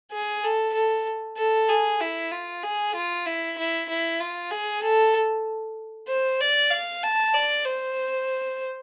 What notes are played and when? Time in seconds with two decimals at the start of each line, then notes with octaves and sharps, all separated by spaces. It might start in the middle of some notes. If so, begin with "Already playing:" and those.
0.12 G#4
0.44 A4
0.74 A4
1.38 A4
1.69 G#4
2.00 E4
2.32 F4
2.63 G#4
2.95 F4
3.26 E4
3.58 E4
3.89 E4
4.20 F4
4.51 G#4
4.83 A4
6.09 C5
6.41 D5
6.71 F5
7.03 A5
7.34 D5
7.65 C5